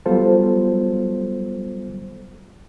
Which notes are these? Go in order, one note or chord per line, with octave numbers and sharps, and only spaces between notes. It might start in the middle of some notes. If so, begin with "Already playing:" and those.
F#3 G3 B3 F4 A4 C5